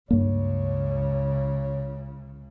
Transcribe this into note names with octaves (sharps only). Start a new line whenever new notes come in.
C#2 G2 C#3 A#3 C#5